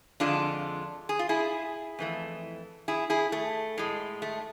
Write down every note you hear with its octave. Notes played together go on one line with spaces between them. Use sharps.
F2 D3 G#3 D4 F4
G#4
F4
E4 G#4
F2 E3 A3
E4 G#4
E4 G#4
A3
A2 G#3
A3